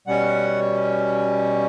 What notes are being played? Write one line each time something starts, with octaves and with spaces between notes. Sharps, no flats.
B2 G3 C#4 F#5